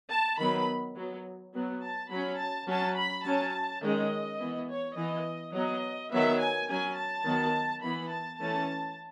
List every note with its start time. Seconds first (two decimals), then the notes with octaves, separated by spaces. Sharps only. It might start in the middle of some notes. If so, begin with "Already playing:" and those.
0.11 A5
0.38 D#3 F#3 B3 B5
0.96 F#3 B3
1.53 F#3 B3
1.81 A5
2.10 F#3 C#4 B5
2.38 A5
2.68 F#3 C#4 A5
2.96 B5
3.25 F#3 C#4 A5
3.82 D#3 G#3 C#4 D#5
4.40 E3 B3
4.68 C#5
4.96 E3 B3 D#5
5.53 F#3 B3 D#5
6.10 D#3 F#3 B3 E5
6.39 G#5
6.68 F#3 C#4 G#5
6.96 A5
7.25 D#3 F#3 B3
7.83 E3 B3 B5
8.11 A5
8.40 E3 A3 C#4 A5